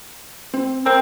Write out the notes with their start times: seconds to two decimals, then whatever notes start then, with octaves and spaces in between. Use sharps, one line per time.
0.54 C4
0.86 C4 A#4 G5 A#5